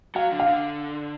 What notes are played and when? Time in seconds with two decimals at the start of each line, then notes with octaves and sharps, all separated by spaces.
0.15 F#3 F5
0.31 D3
0.40 F5
0.48 D3